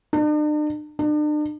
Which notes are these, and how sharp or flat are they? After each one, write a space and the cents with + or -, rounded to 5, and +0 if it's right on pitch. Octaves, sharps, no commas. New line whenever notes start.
D4 +45
D4 +40